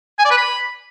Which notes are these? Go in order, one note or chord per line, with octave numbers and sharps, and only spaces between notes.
G#5
D5
B4
B5